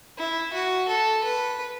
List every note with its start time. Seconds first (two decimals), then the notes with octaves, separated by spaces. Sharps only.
0.18 E4
0.53 F#4
0.88 A4
1.24 B4